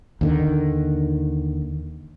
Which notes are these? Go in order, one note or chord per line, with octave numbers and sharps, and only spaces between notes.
D#2 D3 D#3